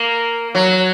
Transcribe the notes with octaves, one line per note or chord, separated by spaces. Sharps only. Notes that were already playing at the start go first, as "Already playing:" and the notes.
Already playing: A#3
F#3